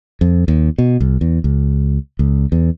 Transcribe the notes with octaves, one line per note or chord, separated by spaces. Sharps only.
F2
D#2
B2
C2
E2
C#2
C#2
E2